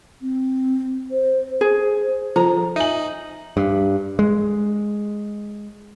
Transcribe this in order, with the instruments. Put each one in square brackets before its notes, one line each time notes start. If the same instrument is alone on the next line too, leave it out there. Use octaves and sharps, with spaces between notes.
[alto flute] C4
C5
[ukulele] G#4 [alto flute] C5
[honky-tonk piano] F3 [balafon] F4 A4 C5 [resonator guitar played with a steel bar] A#5
[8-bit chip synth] D#4 [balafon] E5 G#5 [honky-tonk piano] D#7 F#7
[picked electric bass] G2
G#3